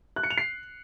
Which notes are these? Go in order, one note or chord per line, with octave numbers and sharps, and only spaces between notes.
F#6
C#7
F7
C7